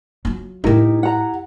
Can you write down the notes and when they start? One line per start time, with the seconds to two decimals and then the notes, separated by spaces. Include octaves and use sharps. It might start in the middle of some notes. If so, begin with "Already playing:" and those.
0.25 F#3 F4
0.64 A2 B3 D#4 E4 G4 A#4
1.03 F#5 A#5